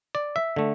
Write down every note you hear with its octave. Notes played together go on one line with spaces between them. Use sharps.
D5
E5
D3 A3